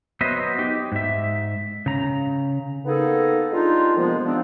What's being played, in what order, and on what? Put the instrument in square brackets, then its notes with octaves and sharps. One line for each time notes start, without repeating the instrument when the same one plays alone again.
[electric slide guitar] F#3 B3 F#4 C5 D#5 E5
D#4 G4
G#2 E5
C#3 A#5
[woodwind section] A#3 B3 D#4 G#4 A4
G3 G#3 D4 D#4 F4
C3 D#3 F3 G#3 A#3 B3
F3 G3 B3 C4 D4